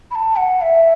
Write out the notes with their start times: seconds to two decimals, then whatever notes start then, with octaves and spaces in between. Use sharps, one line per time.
0.11 B5
0.15 A5
0.36 F#5
0.62 E5